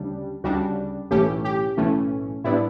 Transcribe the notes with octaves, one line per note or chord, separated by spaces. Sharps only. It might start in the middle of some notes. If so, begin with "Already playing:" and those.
Already playing: D2 C#3 G3 D4
D2 C#3 G3 D4 F#4
B1 A2 E3 A3 C#4 G4
G4
B1 A2 E3 A3 C#4
A2 G3 B3 D4 E4